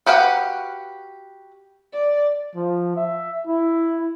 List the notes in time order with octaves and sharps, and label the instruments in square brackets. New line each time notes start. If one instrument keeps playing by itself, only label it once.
[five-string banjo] F#4 G4 B4 F5 F#5
[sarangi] D5
[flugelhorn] F3
E5
E4